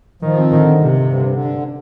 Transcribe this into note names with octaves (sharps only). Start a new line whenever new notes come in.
D#3 F3
C4
D3 D#3
G2
G2 C3
G2
D3
D3
G2